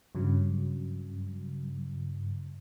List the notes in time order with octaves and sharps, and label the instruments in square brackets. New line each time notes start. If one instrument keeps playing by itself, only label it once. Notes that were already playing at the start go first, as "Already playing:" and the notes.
[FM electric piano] G2 C#3 F#3